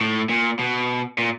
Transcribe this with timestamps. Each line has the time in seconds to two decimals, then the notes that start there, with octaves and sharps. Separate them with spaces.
0.01 A2
0.29 A#2
0.60 B2
1.18 A#2